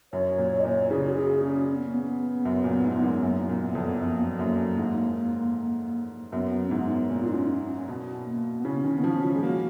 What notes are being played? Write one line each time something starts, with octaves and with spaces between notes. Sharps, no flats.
F#2 C#5
A#2
C#5
D#5
A#2 C#5
C#3 G#4
F#4
G#4
C#4
C#4
B3
A#3
B3
F#2
A#2
G#2
G#2
F#2
F#2 A#3
A#2 A#3
B3
F2
F#2 B3
A#3
F#2 A#3
G#2
F#2 B3
C#4
G#2 B3
A#2
F4
D#4
C#4
C#4
B2
A#3
B3
C#3 C#4
D#3
B3
F3 C#4
F3
G#3
A#3 F#4